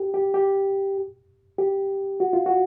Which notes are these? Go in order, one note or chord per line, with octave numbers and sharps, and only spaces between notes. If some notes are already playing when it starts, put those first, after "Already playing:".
Already playing: G4
G4
G4
G4
F#4
F4
F#4